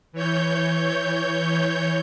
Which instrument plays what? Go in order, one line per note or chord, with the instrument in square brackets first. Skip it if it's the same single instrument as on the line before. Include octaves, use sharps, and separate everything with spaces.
[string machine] E3 C#5 G6